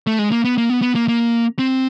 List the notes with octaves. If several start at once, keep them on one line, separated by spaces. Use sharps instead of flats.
A3
G#3
A#3
B3
A#3
B3
B3
A#3
A#3
C4